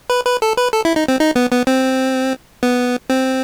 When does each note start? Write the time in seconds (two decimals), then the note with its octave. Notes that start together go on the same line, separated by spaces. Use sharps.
0.10 B4
0.26 B4
0.42 A4
0.57 B4
0.73 A4
0.85 E4
0.96 D#4
1.08 C4
1.20 D#4
1.36 B3
1.51 B3
1.67 C4
2.63 B3
3.10 C4